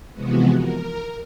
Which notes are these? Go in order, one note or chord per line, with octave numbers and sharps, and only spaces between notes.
C3 E3 F3 G#3 B3 F#4
A#4